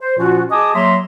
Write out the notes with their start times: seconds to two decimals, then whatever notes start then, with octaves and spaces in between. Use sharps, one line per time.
0.01 C5
0.17 A#2 F3 C#4 F4 F#4
0.50 G#4 D#5 G#5 A5 D6 D#6
0.74 F#3 A#3 E5 A#5 C6